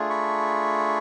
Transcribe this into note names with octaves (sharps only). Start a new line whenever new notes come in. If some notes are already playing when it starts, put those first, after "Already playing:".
Already playing: A3 D4 F4 G#4
B5 C#6